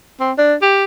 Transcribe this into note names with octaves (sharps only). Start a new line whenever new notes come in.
C4
D4
G4